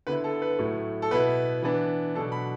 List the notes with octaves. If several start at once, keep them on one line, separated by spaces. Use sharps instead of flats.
D3 B3 E4 B4
A4
B4
A2 F#3 A3 E4
A4
B2 B3 E4 B4
E3 B3 D4
B2 F#3 D4 A4
B5